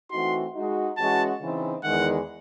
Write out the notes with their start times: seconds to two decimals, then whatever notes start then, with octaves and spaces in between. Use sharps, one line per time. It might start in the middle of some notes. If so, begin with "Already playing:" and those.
0.11 E3 A3 C4 D#4 F#4 C6
0.54 G#3 D#4 F#4
0.97 E3 G#3 C#4 F#4 A5
1.40 C#3 E3 C4 D#4
1.83 E2 D#3 G#3 F#5